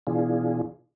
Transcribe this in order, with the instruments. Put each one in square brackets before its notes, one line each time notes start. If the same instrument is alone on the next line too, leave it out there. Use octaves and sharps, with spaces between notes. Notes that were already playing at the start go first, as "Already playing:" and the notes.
[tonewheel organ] B2 E3 D4 F4 G#4